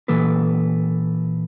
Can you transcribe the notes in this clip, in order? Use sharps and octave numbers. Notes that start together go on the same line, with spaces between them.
A#2 E3 A#3 A4 B4